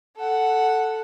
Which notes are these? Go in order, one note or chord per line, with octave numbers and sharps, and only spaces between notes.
A4 F#5